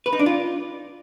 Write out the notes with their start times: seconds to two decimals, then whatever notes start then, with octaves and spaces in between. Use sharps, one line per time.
0.06 B4
0.13 D#4
0.19 D4
0.26 F4